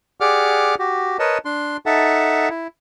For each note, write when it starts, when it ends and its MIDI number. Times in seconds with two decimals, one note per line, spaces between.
0.21 0.75 67
0.21 0.75 68
0.21 0.75 74
0.21 0.75 78
0.21 0.75 86
0.21 0.75 89
0.79 1.17 66
0.79 1.17 67
1.19 1.38 70
1.19 1.38 71
1.19 1.38 73
1.19 1.38 75
1.19 1.38 81
1.45 1.77 62
1.45 1.77 84
1.86 2.49 63
1.86 2.49 69
1.86 2.49 76
1.86 2.49 78
1.86 2.49 81
2.50 2.67 64